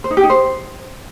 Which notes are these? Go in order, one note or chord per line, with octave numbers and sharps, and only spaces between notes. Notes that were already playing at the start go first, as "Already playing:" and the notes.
C5
D#4
G4
D#4
C5